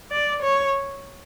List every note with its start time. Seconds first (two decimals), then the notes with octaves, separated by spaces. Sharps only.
0.12 D5
0.43 C#5